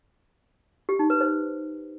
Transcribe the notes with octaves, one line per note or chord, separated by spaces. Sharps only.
G4
D#4
B4
C5